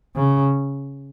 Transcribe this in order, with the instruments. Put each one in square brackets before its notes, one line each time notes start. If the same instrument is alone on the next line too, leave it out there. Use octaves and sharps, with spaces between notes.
[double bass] C#3